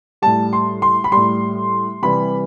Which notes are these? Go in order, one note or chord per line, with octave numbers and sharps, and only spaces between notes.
A2 G3 A5
C6
C6
B5
A2 G3 C6
C3 E3 G3 B5